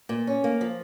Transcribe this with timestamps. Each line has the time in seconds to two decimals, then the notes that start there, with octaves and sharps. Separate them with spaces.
0.09 A#2
0.27 C#4
0.44 A#3
0.61 F3